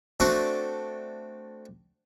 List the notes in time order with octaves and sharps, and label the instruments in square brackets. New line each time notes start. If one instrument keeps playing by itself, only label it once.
[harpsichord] A3 C4 D4 F#4